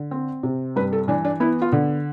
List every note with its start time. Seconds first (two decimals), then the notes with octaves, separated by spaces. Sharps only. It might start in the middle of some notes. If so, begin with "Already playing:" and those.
Already playing: D3
0.11 C4
0.43 C3
0.76 G2 B4
0.93 A4
1.08 E3 D4
1.25 D4
1.40 B3 E4
1.62 F4
1.72 D3